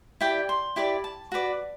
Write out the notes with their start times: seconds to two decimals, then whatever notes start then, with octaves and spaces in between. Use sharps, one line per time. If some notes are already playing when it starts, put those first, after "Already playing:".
0.21 E4 G4 D5 G5
0.49 C6
0.76 E4 G4 D5 B5
1.04 A5
1.32 F#4 B4 D5